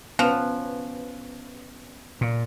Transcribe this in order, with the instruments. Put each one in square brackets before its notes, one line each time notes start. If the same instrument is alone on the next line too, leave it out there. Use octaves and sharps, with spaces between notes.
[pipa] F3 [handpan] B3 C#4 B4
[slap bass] A#2